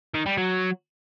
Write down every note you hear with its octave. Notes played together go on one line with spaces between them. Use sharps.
D#3
G3
F#3